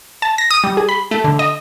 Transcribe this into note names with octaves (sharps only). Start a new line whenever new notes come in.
A5
A#6
D#6
G3
G#4
B5
A3
D3
D#5